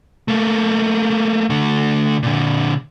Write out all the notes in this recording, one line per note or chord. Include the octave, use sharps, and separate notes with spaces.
A3 A#3
D3 A3
A#2 D3